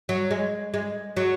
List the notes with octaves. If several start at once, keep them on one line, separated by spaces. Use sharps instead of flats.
F#3
G#3
G#3
F#3